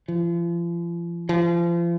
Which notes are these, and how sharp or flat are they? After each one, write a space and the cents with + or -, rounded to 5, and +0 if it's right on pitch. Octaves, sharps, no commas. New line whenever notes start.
F3 -40
F3 -35